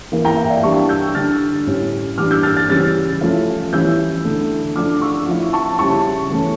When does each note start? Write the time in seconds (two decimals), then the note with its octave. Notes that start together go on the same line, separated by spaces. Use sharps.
0.12 E3 A#3 E4
0.25 G5 A#5
0.37 E5 G5
0.50 D5 F5
0.63 E3 G3 D4 A5 C#6
0.89 E6 G6
1.15 D3 G3 D4 F6 A6
1.66 A2 G3 C#4 E4
2.18 E3 G3 D4 D6 F6
2.31 E6 G6
2.43 F6 A6
2.57 F6 A6
2.69 C#3 E3 G3 C#4 F6 A6
3.21 F3 A3 C#4 E4
3.72 E3 G3 C#4 E4 E6 G6
4.24 D3 A3 E4
4.76 F3 A3 D4 D6 F6
5.02 C#6 E6
5.28 F3 C#4 E4
5.53 A5 C#6
5.79 C#3 G3 C#4 E4 A5 C#6
6.31 E3 A3 C#4